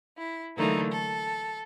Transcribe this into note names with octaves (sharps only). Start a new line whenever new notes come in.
E4
D3 E3 F#3 A3 A#3 D#4
A4